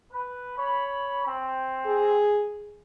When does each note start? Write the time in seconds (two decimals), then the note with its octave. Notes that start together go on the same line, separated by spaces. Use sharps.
0.12 B4
0.58 C#5 B5
1.27 C4
1.86 G#4